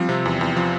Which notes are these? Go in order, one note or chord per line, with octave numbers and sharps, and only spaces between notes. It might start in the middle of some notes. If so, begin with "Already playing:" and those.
Already playing: F3 G3 C4
C3
E2
E2
F3